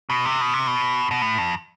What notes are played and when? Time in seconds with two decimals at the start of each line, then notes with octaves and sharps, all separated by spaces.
0.10 B2
0.25 C3
0.41 B2
0.54 C3
0.67 B2
1.11 B2
1.22 A2
1.38 F2